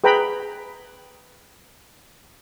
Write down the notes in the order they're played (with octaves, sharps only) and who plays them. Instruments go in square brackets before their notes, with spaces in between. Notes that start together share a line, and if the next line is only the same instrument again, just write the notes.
[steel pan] G#4 B4 G5 A#5 B5